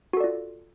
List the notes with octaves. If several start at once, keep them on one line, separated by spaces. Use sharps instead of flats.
F4 F#4 A4 D5